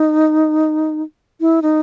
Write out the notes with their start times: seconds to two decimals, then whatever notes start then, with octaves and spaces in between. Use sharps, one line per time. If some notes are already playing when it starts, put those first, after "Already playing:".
Already playing: D#4
1.41 E4
1.62 D#4